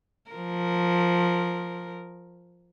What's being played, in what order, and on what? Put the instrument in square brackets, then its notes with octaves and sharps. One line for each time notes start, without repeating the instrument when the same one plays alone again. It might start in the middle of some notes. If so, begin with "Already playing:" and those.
[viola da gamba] F3 A#4